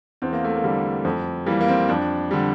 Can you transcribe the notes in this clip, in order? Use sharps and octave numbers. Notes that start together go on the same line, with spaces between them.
E2 C4
A#3
A3
A#3
D3 G3
F2 A3
E3 G3 A#3
A#3
C4
F2 D4
D3 G3